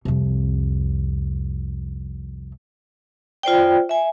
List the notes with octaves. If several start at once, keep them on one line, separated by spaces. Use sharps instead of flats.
C2 F2
F4 C5 D5 G5
E5 G#5